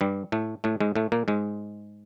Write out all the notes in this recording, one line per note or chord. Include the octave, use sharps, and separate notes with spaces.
G2 G3
A2 A3
A2 A3
G#2 G#3
A2 A3
A#2 A#3
G#2 G#3